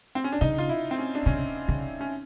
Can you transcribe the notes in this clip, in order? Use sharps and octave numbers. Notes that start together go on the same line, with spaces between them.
C4
C#4
D4
C#3 D#4
F4
E4
C4
C#4
D4
C#3 C#4
C#3
C#4